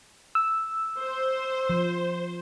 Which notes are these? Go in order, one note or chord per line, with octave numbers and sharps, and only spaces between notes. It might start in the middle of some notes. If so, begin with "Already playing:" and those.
E6
C5
F3